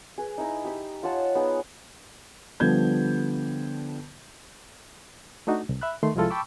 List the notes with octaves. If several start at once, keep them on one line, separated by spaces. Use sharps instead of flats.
G#4 B4
D#4 E4 D#5 A#5
G4 B5 D#6
F4 C#5 F#5 A5
B3 D#4 G#4 B4
D3 F3 G3 B3 G6 G#6
A3 D4 D#4 F#4
C2
E5 B5 F#6
D#3 A3 C6
C2 F3 G#3 E4 F4 A4
G5 A5 B5 C#6 D6 E6